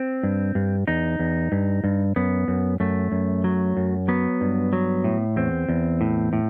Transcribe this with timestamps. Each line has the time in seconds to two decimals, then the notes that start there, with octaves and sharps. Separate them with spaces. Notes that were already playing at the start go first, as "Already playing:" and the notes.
Already playing: C4
0.23 G2
0.55 G2
0.87 E2 D#4
1.19 E2
1.52 G2
1.84 G2
2.16 F#2 B3
2.48 F#2
2.80 F#2 A3
3.12 F#2
3.44 F#3
3.77 F#2
4.08 F#3 B3
4.41 G2
4.73 F#3
5.04 A2
5.36 E2 C4
5.69 E2
6.01 A2
6.33 A2